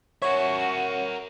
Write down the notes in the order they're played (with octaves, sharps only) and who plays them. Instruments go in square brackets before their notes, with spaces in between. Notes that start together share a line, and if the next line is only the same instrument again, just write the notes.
[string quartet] F#4 [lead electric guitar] A#4 E5 [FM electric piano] C#5